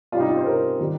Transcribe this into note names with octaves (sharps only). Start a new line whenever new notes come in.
C3 G3 C#4 F4
D#4
F4
C5
C3 G3 C#4 A#4
D#3 G3